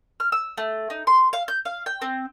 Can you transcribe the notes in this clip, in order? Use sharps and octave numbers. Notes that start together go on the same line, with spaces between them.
F6
E6
A3
D#4
C6
F5
G6
F5
G5
C4